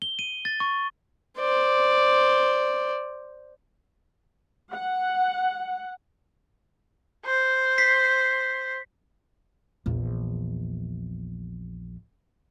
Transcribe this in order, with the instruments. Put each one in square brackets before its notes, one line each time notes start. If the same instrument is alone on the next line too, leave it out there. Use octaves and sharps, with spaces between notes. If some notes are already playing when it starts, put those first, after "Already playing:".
[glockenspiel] G7
D#7
A6
C#6
[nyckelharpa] C5 D5
[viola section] F#5
[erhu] C5
[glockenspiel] B6 C7
[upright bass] A#1 E2